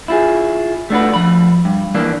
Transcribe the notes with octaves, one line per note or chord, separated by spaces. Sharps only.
E4 F4 G#4
A3 D4 F#4 B4
F3 B5
G2
E3 A#3 D4